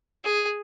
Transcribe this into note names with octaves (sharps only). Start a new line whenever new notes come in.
G#4